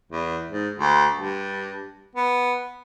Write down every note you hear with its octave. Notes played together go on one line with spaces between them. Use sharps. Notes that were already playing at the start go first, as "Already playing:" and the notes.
E2
G#2
D2
G2
B3